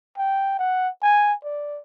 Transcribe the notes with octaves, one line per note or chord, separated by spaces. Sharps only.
G5
F#5
G#5
D5